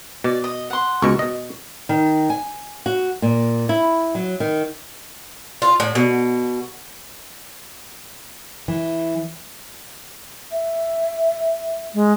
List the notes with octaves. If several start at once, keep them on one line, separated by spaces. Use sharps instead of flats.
B2 D5
D#5
F#5 C6
C#2 B2 C#6
B2 D#5
D#3
G#5
F#4
A#2
E4
F#3
D#3
F4
A2
B2
E3
E5
G#3